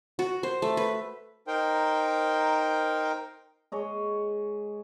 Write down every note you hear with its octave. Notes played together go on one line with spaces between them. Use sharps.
F#4
C5
A3
B4
D#4 A#4 C5 G5
G#3 G#4 C#5 D#5